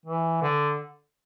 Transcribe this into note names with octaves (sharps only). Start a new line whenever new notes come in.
E3
D3